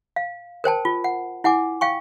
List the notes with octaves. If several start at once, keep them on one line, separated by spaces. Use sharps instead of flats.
F5
A#4 C5 G5 A5
F4
F#5
E4 F#5 G#5 D6
F5 G5 C#6